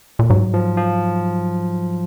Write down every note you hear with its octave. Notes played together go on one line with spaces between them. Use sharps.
A#2
G#2 F#3
F3
F3